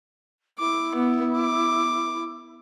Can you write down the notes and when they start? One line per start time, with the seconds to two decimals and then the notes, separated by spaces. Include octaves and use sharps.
0.59 E4 D6
0.96 B3
1.38 D6